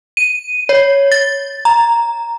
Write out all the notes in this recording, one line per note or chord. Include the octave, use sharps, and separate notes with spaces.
D#7
C#5
A6
A#5